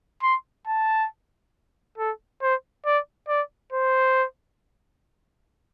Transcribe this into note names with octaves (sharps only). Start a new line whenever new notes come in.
C6
A5
A4
C5
D5
D5
C5